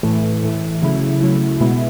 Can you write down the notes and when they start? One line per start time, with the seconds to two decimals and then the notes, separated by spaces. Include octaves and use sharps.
0.03 A2 E3 A3
0.43 A2 E3 A3
0.82 C#3 F#3 A3 E4
1.21 C#3 F#3 A3 E4
1.60 B2 G#3 B3 E4